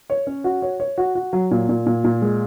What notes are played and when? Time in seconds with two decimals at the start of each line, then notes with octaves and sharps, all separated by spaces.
0.10 C#5
0.27 C#4
0.44 F#4
0.62 C#5
0.80 C#5
0.98 F#4
1.15 F#4
1.33 F#3
1.51 A#2
1.69 A#2
1.86 A#2
2.04 A#2
2.22 G#3